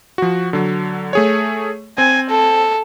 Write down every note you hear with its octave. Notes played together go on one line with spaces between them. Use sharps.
F3 F#4
D3 F#3
A3 G#4 C#5
C4 G#5
A4